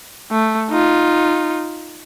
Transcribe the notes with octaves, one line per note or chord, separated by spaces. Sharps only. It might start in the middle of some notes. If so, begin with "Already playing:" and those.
A3
D#4 F4